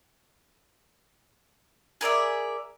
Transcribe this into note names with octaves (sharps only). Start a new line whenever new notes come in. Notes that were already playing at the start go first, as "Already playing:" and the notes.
G#4 A#4 D5 E5